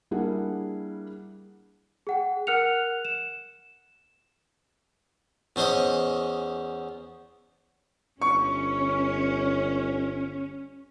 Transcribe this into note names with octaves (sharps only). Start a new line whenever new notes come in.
G3 A#3 D4 E4 G#4 F#5
G#4 F#5 G5
A#4 F#5 F6 F#6 C#7 F7
E7
E2 C#4 C5 D#5 D#6
G1 C#4 C#6